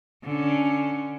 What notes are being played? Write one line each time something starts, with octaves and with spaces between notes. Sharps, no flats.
D3 C#4